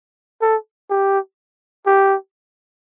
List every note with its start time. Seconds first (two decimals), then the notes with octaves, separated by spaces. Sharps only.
0.42 A4
0.90 G4
1.87 G4